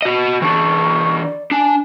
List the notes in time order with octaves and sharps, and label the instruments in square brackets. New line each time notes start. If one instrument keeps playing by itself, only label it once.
[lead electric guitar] F#4 D#5
[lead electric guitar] E3 D4 [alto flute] C#6
[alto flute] D5
[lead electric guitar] D4 [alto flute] G#5